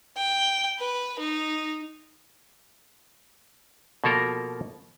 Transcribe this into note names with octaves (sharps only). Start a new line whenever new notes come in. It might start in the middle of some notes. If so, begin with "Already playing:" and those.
G5
B4
D#4
B2 F3 A#3 A4 A#4